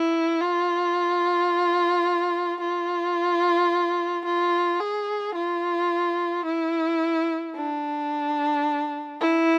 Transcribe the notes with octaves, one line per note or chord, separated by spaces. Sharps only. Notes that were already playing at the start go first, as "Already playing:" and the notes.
Already playing: E4
F4
F4
F4
G#4
F4
E4
D4
E4